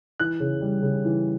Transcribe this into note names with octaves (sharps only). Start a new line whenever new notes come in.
E3 F#6
C#3
G3
C#3
E3